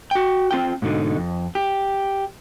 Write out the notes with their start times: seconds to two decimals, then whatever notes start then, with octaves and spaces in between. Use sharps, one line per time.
0.11 F#4 G5
0.51 C4 F4 G5
0.82 G#2 B2 D3 D#4
1.18 F2
1.55 G4